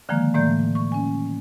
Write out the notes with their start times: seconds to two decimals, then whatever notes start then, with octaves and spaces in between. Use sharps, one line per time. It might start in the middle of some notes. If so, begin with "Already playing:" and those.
0.09 D3 D#3 F3 G#3 A#3
0.34 A2 E3 A3 A#3 D5 G6
0.75 C#6
0.92 C#4 G#5